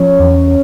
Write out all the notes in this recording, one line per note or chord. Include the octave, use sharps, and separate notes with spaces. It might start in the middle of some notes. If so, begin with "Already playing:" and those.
Already playing: F3 C#4 C#5
E2